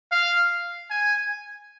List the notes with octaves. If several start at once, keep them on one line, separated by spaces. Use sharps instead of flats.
F5
G#5